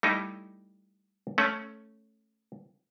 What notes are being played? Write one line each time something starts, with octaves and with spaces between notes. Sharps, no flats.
G3 A3 D#4 E4
A3 C#4